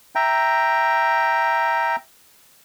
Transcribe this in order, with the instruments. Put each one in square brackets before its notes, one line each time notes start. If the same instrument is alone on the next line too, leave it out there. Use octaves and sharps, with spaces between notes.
[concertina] E5 G5 A#5